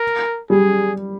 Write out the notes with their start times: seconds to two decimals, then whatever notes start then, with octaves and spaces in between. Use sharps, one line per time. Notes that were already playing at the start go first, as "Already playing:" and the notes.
Already playing: A#4
0.50 G3 G#4